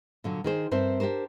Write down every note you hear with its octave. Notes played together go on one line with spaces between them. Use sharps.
A#2 D3 F#3
D#3 G#4 C5
G2 C4 A#4 C5 E5
D4 G4 G#4 A#4 C5